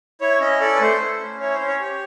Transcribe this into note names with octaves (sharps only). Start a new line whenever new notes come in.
E4 C#5
C#4 D#5
A4 D5
B4
A3 C5
E4
C#4
E4 C#5
C5
C#4
C#5
G4